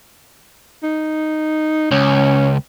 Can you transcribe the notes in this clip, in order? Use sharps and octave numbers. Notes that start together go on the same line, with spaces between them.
D#4
C#2 C#4